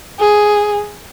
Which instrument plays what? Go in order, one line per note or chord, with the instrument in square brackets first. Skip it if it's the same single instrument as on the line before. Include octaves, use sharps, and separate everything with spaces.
[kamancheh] G#4